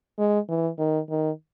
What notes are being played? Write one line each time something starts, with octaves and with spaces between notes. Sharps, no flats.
G#3
E3
D#3
D#3